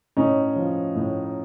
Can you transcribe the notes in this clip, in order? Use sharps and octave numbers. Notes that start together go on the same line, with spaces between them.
A2 C#4 D#4
F3
A2